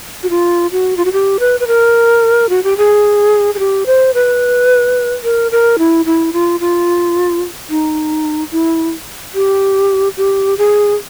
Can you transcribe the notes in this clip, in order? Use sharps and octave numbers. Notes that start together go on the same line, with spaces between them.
F#4
F4
F#4
F4
F#4
G4
B4
B4
A#4
F#4
G4
G#4
G#4
G4
C5
B4
A#4
A#4
E4
E4
F4
F4
D#4
E4
G4
G4
G#4